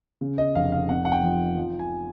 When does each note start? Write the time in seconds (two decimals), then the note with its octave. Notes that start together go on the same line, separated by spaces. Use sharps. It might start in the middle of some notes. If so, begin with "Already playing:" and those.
0.21 C#3
0.38 D#5
0.55 F1 F5
0.72 F5
0.89 C3 F#5
1.05 F#5
1.12 G5
1.23 F3
1.57 F3
1.79 G#5